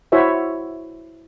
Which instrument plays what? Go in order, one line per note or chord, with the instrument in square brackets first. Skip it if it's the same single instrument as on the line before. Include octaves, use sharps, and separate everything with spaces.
[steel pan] E4 F#4 C5 C#5 E5